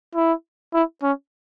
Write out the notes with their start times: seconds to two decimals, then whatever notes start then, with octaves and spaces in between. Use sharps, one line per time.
0.15 E4
0.73 E4
1.03 C#4